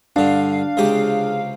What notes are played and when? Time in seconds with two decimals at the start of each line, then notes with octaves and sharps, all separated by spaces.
0.16 G2 D3 D4 F5
0.77 C#2 C3 G4 G#4